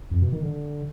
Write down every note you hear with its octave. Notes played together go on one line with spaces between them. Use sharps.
F2
B2
D#3
D3